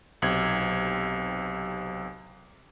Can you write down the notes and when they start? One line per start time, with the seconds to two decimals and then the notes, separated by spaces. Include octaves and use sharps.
0.22 B1 C3 G#6